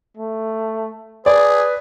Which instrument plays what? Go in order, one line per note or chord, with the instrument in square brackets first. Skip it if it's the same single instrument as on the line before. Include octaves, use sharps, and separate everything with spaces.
[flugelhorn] A3
[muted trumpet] G#4 [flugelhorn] B4 [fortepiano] D5